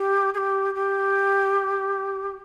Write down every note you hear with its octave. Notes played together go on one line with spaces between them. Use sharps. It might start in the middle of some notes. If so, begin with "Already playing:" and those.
Already playing: G4
G#4
G4
G4